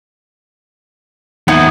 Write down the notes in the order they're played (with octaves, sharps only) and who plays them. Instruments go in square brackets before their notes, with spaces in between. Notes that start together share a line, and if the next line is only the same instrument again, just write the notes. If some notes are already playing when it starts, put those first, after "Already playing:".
[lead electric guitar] D#2 D#3 [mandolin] B3 D#4 E4